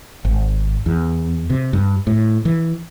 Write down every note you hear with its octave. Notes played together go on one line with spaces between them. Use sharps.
G#1
E2
C3
G2
A2
E3